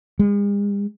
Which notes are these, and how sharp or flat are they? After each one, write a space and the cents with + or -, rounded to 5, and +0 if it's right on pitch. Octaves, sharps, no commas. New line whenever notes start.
G#3 -45